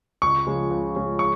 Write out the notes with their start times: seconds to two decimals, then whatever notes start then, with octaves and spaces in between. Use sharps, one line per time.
0.22 C#2 C#6
0.47 C#3 F3 G#3
0.71 C#2
0.96 C#3 F3 G#3
1.19 C#6